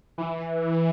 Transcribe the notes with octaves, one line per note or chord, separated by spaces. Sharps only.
E3